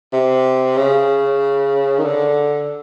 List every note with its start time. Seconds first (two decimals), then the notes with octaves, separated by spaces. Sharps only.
0.13 C3
0.77 C#3
1.98 D#3
2.05 D3